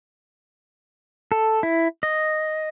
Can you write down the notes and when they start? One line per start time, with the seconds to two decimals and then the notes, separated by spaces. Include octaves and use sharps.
1.32 A4
1.63 E4
2.03 D#5